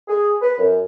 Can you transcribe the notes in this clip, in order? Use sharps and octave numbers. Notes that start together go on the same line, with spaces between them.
G#4
B4
F#2